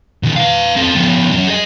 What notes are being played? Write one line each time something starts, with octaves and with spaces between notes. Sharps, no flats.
B2 D#3
B4 F5
C4 A4
F3 B3
F#3 C#4
G#4 D#5